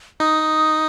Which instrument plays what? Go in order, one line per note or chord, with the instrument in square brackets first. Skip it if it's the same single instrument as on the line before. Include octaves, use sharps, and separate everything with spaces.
[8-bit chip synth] D#4 [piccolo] D#6